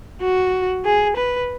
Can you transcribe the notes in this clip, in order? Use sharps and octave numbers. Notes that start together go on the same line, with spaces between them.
F#4
G#4
B4